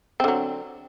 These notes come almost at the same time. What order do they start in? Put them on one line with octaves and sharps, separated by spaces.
C4 D3 F#3